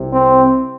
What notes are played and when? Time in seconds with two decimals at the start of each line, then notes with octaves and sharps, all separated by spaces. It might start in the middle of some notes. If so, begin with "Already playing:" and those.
Already playing: C2 C3
0.12 C4